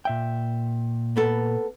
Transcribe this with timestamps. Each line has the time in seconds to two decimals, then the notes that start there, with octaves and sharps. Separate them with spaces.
0.05 A#2 E5 G5
1.16 A#3 B3 A4